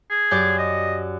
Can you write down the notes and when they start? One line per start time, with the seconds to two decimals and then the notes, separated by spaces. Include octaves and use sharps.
0.10 G#4
0.31 F#2 G4 D5
0.58 D#5